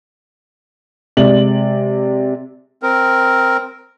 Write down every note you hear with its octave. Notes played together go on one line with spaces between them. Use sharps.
C3 G#3 D5 F#7
C4 A#4